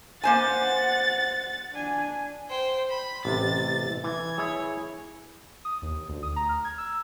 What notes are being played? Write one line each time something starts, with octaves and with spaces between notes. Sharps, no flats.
A#3 C5 F#5 G#5 A6
D4 G#5
C5 G5
B5
A1 C3 A6
E3 G#6
E4 G#4 C#5
D#6
D#2
D2
D#6
A#5
F6
G#6
E6